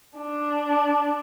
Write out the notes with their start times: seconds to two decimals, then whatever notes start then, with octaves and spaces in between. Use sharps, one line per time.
0.17 D4